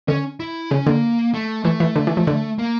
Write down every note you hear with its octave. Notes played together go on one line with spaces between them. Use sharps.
D3 C#4
E4
C#3 C#4
D3 A#3
A3
E3 A3
E3
D3
E3
F3
D3
A#3